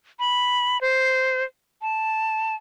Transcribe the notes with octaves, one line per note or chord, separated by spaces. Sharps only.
B5
C5
A5